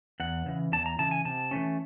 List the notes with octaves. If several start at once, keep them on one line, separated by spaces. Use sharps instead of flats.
E2 F#5
C#3 E3
E2 A5
A#5
C#3 E3 A5
G#5
C3 A5
E3 A3 C#4